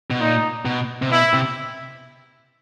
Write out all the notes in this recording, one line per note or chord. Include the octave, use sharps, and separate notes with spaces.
B2
A#2 D#4
B2
C3
B2 E4
C3